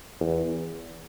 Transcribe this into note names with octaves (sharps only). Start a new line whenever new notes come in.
E2